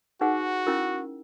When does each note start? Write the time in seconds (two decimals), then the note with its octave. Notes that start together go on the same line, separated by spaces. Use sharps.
0.21 D#4 F#4 G#4 B4 F#5
0.67 C#4 E4 A#4